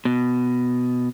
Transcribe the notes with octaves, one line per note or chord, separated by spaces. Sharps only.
B2